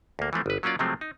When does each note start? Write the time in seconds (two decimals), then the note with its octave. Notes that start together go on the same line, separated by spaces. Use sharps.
0.19 D2 A#3
0.33 E3 F3 A3 C4
0.46 G1 B4
0.63 F#3 A#3 C#4 F4 D5
0.79 C3 F3 F#3 G#3 A3 C4
1.01 D#4